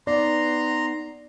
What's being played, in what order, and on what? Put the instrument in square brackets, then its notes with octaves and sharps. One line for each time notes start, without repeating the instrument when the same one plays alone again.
[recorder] B3 [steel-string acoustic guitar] D#4 [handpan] D5 [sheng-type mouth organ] A#5 C6